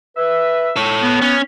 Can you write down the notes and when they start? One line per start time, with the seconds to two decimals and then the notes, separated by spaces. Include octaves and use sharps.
0.17 B4 E5
0.76 A4 C#5
1.02 B3
1.22 C#4